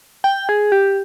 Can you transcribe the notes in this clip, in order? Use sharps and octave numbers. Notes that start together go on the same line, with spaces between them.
G5
G#4
G4